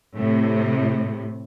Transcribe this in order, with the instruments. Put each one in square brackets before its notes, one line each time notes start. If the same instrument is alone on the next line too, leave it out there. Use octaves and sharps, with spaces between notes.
[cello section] A2 C3